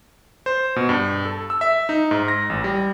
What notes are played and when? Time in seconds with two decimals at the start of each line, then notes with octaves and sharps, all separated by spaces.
0.46 C5
0.76 B2
0.89 G2
1.25 A4
1.50 E6
1.61 E5
1.89 D#4
2.11 G#2
2.28 A#6
2.50 A1
2.64 G3